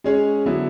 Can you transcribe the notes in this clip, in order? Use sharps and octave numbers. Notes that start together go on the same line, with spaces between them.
G#3 C#4 G#4 C#5
D3 F#3 B3 E4